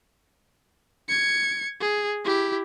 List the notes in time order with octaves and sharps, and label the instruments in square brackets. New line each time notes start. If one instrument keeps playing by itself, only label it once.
[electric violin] G#6 C#7
G#4
E4 G4